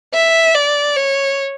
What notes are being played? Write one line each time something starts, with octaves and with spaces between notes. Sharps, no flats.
E5
D5
C#5